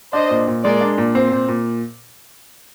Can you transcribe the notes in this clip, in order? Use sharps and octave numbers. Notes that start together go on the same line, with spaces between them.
D4 C5 D#5
A#2
A#2
G#3 A#4 D5
D4
A#2
C4 C5
A#2
A#2